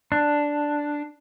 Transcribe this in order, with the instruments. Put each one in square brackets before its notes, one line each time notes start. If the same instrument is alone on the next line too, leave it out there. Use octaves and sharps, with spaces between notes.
[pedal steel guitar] D4